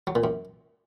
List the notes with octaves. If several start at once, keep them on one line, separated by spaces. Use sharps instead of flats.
F#3
A#2
F#2